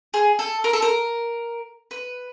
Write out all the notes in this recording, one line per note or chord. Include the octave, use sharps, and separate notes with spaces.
G#4
A4
A#4
A4
A#4
B4